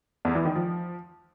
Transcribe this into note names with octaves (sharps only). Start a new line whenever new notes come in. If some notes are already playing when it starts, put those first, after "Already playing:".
E2
E3
D#3
F3